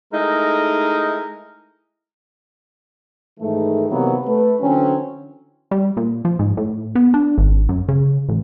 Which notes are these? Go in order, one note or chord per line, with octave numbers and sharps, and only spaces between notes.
G#3 A3 D#4 E4 A#4
G#2 D#3 E3 A3
C3 D#3 E3 F#3 A#3 B3
A3 B4
D3 E3 F#3 C4 C#4
G3
A#2
F3
G#2
A2
B3
D4
G#1
F#2
C#3
A1